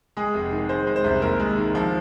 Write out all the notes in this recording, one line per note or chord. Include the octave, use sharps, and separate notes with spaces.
G#3 G#4
F1
D#3
G#3 C5
G#3
C5
C2
D#2 A#4
G#3
D#3
F3